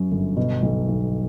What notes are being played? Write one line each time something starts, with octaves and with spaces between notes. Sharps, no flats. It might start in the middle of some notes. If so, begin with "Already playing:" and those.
Already playing: F#2 F#3
G1
B2
B1
B1